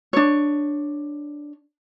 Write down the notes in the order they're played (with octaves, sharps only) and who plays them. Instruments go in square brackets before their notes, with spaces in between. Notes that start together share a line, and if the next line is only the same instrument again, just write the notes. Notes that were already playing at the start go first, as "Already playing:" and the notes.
[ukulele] D4 C#5